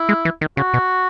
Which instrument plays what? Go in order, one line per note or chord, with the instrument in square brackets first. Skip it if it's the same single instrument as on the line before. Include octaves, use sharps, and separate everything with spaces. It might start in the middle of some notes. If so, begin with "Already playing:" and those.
Already playing: [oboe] E4
[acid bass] G#3
E3
D#3
[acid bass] C#3 [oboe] F#4
[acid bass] B2